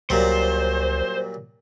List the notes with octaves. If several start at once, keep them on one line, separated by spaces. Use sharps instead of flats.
C#2 A#2 F#3 G3 C5